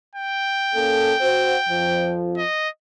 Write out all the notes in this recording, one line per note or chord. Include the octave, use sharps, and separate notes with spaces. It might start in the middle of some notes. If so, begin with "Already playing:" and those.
G5
A#3 C#4 A4
F#4 C5
F2 F3
D#5